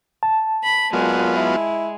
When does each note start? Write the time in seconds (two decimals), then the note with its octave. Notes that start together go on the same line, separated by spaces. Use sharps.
0.23 A5
0.64 B5
0.93 A#2 F#3 G#3 B3 F4
1.36 E4